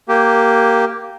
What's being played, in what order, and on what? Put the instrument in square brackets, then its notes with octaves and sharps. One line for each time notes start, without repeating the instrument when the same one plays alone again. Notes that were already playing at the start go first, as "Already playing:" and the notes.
[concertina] A#3 G4